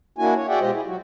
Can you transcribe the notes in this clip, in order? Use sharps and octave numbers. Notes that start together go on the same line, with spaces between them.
A#3 D4 E4 F#4 G#5
C#5
F#4 G#4 D5 E5 F#5 G5
B2 G#3 F4 G4 C5 D#5
E4 G#4
F#3 F#4